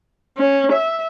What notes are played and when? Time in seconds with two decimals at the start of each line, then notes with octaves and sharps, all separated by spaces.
0.37 C#4
0.72 E5